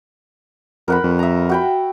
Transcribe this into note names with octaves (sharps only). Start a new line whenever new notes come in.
F2 A#4 F#5 B5
F2
E5 A#5
F#4 G5 B5